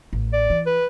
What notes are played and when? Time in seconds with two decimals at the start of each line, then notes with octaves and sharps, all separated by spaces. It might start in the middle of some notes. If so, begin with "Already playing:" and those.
0.13 A1
0.33 D5
0.50 E3
0.66 B4